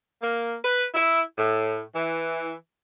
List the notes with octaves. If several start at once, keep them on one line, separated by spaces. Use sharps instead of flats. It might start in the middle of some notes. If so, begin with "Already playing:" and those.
A#3
B4
E4
A2
E3